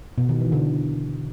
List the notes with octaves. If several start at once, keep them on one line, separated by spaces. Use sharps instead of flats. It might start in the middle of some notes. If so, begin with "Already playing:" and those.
B2
D#3
E3
D3